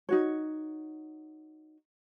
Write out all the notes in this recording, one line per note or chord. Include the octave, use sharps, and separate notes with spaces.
D#4 F#4 C#5